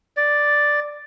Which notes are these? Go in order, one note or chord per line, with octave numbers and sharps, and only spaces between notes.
D5